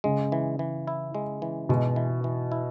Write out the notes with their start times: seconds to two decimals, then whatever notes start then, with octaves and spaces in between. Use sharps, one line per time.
0.04 C#3 G#3
0.32 E3
0.59 E3
0.87 E4
1.15 G#3
1.42 E3
1.69 B2 G#3
1.96 E3
2.24 E3
2.52 E4